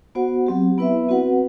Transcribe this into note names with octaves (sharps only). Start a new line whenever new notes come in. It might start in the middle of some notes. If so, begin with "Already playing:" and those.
B3 F#4 C5 F#5
F#3 C4 G4
B3 E4 B4 E5
C4 F#4 B4 F#5